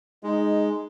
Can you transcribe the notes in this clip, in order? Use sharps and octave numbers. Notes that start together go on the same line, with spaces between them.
G#3 D#4